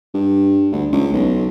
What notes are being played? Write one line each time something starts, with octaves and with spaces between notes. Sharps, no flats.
G2
D2
C#2
B1